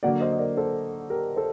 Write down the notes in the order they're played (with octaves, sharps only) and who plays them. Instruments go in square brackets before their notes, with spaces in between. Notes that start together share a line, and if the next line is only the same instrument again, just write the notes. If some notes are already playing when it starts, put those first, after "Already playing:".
[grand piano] D3 F#3 A#3 D5 F#5
C5 D#5
D#5
A#4 D5
A4 C5
G4 A#4
A4 C5